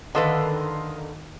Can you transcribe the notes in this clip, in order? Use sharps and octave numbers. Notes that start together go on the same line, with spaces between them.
D3 D#3 A4 B4 D#5 F5 C6